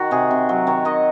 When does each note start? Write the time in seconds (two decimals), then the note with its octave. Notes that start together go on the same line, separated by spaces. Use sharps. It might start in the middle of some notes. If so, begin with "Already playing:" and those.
Already playing: D#3 F#4
0.11 C3 G#4
0.31 C3
0.49 F#3
0.67 D#3 C#5
0.85 D#3 D#5